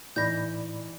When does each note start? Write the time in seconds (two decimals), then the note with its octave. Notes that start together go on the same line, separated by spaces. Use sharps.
0.16 A2 E3 D#4 D5 B5 G6 A#6